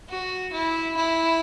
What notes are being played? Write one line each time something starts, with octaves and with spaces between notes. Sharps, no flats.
F#4
E4
E4